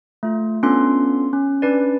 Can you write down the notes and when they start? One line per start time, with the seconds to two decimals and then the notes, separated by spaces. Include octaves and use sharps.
0.23 A3 F4
0.63 B3 C#4 D4 F4 A4 C6
1.33 C#4
1.62 C#4 D4 B4 D5